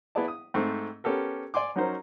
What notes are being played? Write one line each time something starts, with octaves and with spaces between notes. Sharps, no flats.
B3 E4 G#4 D5 A5
D#6
G#2 A3 C4
B3 C#4 G4 A4 A#4
D5 G#5 C6 D6
F#3 C#4 D#4 F#4 A#4 C5